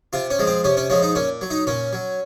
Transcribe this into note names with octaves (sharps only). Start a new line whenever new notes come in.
C3 F4
C#4
F3 G#3
C4
C3 C#4
C#4
F3 G#3 C#4
D#4
A#2 C#4
F#3
D#4
A#2 C#4
F#3